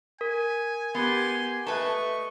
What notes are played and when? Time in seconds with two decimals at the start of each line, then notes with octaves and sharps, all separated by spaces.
0.21 A#4 G#5
0.95 B3 G4 C6
1.67 A3 B4 D#5 A5 C#6